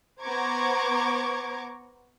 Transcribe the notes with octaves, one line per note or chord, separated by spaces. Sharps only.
B3 C5 A#5 C#6 D6 G#6